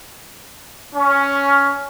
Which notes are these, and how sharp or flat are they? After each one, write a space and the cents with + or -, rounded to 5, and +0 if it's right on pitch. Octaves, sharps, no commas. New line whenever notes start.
C#4 +10